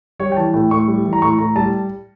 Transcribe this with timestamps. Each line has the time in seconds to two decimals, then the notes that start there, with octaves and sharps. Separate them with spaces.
0.19 G3 C#5
0.32 G5
0.37 E3 A5
0.53 A2 G5
0.71 A2 C#6
0.88 G3
1.05 E3
1.13 A#5
1.22 A2 C#6
1.39 A2 A#5
1.56 G3 A5